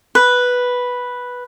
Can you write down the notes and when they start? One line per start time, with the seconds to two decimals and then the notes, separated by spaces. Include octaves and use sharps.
0.15 B4